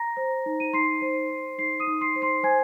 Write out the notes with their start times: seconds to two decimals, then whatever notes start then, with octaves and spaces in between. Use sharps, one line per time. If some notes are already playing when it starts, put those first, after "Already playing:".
Already playing: A#5 A#6
0.17 C5
0.46 D#4
0.60 D#7
0.73 D#4 C6 C7
1.02 C5
1.30 C5
1.58 D#4 C6 C7
1.80 D#6 D#7
1.87 D#4
2.01 C6 C7
2.15 C5
2.22 C6 C7
2.43 C5 G#5 G#6